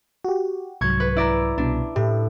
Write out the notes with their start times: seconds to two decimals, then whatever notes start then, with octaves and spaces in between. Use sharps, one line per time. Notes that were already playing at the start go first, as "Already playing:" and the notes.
0.24 F#4 G4
0.81 C2 G#2 F#3 C#6 G#6
1.00 B4
1.16 E4 D5 A#5
1.58 C2 B2 D4
1.96 A2 G4